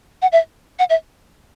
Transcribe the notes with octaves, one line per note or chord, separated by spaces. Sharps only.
F#5
E5
F#5
E5